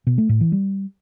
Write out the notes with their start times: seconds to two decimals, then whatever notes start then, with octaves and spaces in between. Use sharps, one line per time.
0.07 B2
0.18 A3
0.29 A2
0.41 E3
0.52 G3